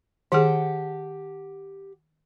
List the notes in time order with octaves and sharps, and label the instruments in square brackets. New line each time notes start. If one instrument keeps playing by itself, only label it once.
[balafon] D#3 G#4 [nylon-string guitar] G4 F#5 A5